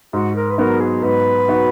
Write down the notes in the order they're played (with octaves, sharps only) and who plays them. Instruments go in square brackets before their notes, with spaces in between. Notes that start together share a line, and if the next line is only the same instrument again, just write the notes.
[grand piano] G#2 [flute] F#4
[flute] A#4
B4
[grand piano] F#3 B3 D#4 F#4 [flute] A#4
[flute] G#4
[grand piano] G#2 [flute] B4
[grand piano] F#3 B3 D#4 F#4